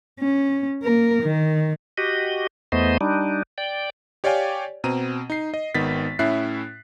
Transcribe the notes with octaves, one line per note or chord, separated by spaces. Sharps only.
C#4
A#3 A#4
D#3
F#4 G4 D#5
E2 A3 B3 C5 D#5
G3 D4 D#4
D5 G5
G4 C#5 D5 F5 G5 G#5
B2 C4 A#5 D#7
D#4 C7
D#5
G#1 D#3 B3 A6 B6
A2 C#4 E4 E5 F#6 C7